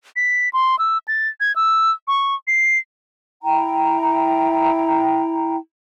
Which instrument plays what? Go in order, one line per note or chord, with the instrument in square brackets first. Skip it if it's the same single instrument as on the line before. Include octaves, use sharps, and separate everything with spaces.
[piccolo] B6
C6
E6
A6
G#6
E6
C#6
C7
[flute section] E4 G5 A#5